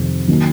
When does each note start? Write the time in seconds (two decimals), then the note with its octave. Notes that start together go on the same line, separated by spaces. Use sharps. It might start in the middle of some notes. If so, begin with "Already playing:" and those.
Already playing: F2 C3 D#3
0.28 D#3 F#3 A#3 D#4